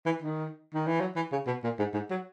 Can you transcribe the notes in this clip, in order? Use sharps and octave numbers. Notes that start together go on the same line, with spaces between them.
E3
D#3
D#3
E3
F#3
E3
C#3
B2
A#2
G#2
G#2
F#3